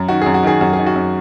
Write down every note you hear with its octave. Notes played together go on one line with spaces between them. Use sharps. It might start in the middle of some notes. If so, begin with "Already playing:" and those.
Already playing: F#2
D#3 F#4
F#2 G#4
F#4
D#3 G#4
F#2 F#4
D#3 G#4
F#4
F#2